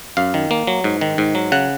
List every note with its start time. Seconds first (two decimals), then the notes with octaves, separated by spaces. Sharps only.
0.17 F#2 F5
0.34 D#3
0.51 A#3
0.67 F#3
0.84 G#2
1.01 D#3
1.18 G#2
1.35 F#3
1.52 C#3 F#5